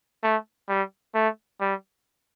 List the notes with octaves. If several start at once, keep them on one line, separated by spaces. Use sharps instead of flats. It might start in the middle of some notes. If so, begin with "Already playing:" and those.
A3
G3
A3
G3